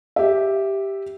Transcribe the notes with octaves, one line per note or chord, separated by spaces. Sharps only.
G4 E5